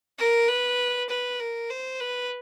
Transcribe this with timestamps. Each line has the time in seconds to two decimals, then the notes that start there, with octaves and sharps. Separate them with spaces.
0.19 A#4
0.48 B4
1.09 B4
1.39 A#4
1.70 C5
2.00 B4